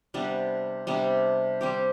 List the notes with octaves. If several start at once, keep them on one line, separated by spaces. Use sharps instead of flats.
C3 G3 B3 D4
C3 G3 B3 D4
G3 C4 G4